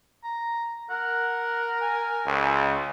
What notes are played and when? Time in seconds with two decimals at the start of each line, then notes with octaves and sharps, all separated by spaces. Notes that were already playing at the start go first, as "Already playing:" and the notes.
0.24 A#5
0.90 A#4 F#5
1.82 G#5
2.26 C#2